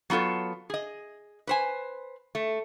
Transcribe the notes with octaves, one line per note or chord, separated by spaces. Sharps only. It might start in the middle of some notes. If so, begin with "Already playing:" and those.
F#3 B3 F4 A4 C#5
G#4 D#5
B4 C5 G#5
A3